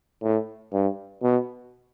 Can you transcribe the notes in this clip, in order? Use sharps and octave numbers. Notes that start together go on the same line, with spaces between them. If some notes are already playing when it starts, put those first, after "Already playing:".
A2
G2
B2